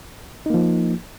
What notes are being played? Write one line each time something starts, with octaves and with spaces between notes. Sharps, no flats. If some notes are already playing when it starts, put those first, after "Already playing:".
F3 A#3 D#4